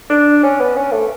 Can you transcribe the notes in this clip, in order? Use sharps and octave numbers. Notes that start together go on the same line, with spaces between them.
D4
C#4
B3
C#4
A3